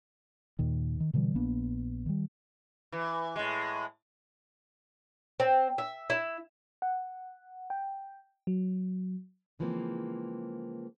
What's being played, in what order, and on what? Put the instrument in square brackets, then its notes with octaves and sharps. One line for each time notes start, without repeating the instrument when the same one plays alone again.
[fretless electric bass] D#2 A#2 D#3
D#3
B2 D3 E3 G3
A#1 A#3 B3 D4
D#3 G3
[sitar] E3
A2 G#3
[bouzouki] C4
E5
E4
[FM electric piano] F#5
G5
F#3
[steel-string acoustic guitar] C#3 E3 F3 G#3 A#3 C4